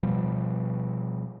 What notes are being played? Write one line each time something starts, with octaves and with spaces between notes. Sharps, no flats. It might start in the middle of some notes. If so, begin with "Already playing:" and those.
B2 F3 G3